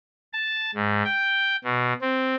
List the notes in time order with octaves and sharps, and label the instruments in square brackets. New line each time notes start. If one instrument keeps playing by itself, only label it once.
[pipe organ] A5
G#2
G5
B2
C4